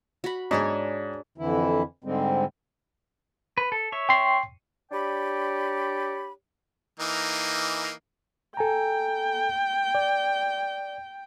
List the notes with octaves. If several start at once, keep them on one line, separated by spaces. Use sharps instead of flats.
F#4 B5
G#2 D4 G#4 C#5
F2 D3 E3 E4
G#2 D3 G3 G#3 C4
B4
A4
C#5 E5
G5 C6 C7
D4 G4 C#5 D5 G5 B5
E3 A#3 D#4
A4 G5 G#5 A#5
D5